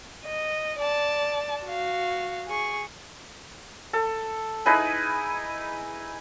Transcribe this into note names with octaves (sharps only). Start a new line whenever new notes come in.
D#5
D5 A5
F#4 F5
G#4 C#6
A4
D#4 E4 G#4 B4